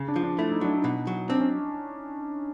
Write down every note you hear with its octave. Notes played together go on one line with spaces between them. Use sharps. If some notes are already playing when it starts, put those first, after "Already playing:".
Already playing: C#3
D4
F3
D4
A3 E4
D#4
F#3 D4
D#4
B2
F#3
C4 D4
C#4